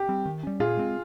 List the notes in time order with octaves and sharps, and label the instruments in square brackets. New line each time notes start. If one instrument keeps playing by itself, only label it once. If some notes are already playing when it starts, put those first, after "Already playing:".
Already playing: [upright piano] G4
[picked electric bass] G3 C4
D#3
G3 C#4
[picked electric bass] A#2 [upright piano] F4 G#4
[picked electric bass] G#3 C4